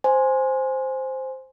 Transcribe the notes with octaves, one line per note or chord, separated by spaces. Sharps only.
C5 G#5